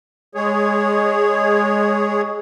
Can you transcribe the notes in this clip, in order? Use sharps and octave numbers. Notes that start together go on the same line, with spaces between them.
G#3 G#4 C#5